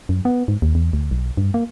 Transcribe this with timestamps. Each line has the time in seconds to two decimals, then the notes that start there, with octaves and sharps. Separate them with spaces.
0.09 F#2
0.25 B3
0.48 G#2
0.62 D#2
0.75 E2
0.93 D2
1.11 B1
1.37 G2
1.54 A#3